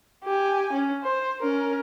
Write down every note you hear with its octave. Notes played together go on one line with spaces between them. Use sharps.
G4 G#5
C#4
C5
C#4 A#4